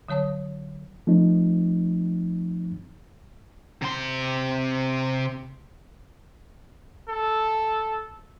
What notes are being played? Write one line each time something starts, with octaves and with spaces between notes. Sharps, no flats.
D3 F#3 C#5 A5 D#6
F3 A3 C4 D#4
C3 C6
A4